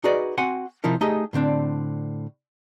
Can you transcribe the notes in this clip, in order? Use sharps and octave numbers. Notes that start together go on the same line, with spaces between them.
D#4 F#4 G#4 B4 D5 D#5
C4 F#4 F#5 G#5 C6
C3 F3 D#4 E4 A#4
A3 D#4 G4 G#4 D#5
A2 D3 C4 D4